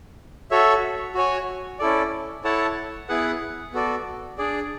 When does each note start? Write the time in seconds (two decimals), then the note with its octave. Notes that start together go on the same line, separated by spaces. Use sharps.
0.51 F#4 A4 C#5 E5
1.15 F#4 C#5 G#5
1.79 C#4 E4 A4 D5
2.44 E4 A4 C#5 F#5 A5
3.09 B3 E4 G#4 B4 F#5
3.73 B3 F#4 A4 D5
4.38 D4 G#4 D5